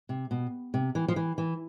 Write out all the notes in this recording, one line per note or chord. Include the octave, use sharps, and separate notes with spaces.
C3
B2
C3
E3
F3
E3
E3